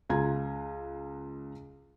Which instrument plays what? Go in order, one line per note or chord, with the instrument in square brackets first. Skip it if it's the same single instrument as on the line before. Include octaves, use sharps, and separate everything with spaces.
[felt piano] C#2 F4 F5 A#5 G#6